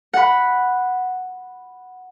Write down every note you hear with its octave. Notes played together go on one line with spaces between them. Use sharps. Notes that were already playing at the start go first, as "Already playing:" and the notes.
F#5 B5